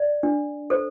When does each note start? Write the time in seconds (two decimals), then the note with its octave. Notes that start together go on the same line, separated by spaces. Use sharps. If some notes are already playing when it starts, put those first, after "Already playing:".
Already playing: D5
0.23 D4
0.70 A4 C5